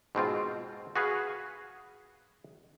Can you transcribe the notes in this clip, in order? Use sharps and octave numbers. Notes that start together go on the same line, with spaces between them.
G#2 B2 C4 F4
F#4 G#4 B4 F5